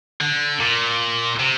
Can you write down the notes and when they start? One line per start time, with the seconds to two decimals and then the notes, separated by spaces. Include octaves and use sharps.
0.21 D3
0.60 A#2
1.39 C3